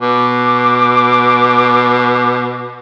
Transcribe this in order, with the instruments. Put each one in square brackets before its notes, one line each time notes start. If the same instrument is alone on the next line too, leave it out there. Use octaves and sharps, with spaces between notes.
[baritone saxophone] B2 [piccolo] D6